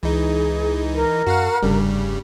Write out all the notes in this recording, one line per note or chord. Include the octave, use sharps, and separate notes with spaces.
C#2 E3 D#4 G#4
A#4
F#2 F#4 F5 F#5
F1 G2 C#3 G3